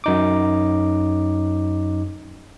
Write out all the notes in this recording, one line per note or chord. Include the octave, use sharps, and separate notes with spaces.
F#2 D#4 D6